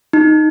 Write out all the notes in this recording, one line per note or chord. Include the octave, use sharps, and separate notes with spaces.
D#4